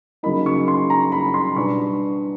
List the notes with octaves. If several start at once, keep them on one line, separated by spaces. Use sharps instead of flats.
C#3 F#3 A#3 D#4 B5
C#6
C6
A#5
B5
C6
B2 G3 B3 D4 C#6